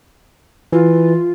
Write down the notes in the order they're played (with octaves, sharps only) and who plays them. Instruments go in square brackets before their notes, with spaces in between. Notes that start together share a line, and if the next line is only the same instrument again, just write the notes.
[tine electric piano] E3 [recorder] F4